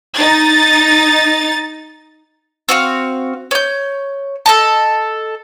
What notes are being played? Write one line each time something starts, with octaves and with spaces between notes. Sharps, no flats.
D#4 A6
C4 F#4 F5
C#5 G6
A4 D#5 A5